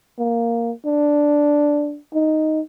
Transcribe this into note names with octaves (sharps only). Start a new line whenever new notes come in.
A#3
D4
D#4